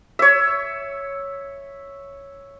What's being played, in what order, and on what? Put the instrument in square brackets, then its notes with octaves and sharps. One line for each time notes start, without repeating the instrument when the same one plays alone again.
[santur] C#5 E5